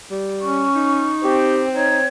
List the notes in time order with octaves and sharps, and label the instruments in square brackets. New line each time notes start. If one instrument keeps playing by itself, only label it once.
[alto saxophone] G3
[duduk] C#4 [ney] C#6
[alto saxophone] D#4
[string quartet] C4 [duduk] G4
[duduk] D#4 [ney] C#5